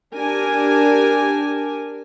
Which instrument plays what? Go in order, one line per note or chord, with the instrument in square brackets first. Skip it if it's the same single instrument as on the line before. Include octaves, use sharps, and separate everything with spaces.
[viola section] D4 G4 A#4 G#5